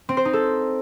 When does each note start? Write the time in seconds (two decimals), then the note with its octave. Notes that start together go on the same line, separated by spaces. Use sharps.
0.09 C4
0.17 C5
0.25 D#4
0.33 A4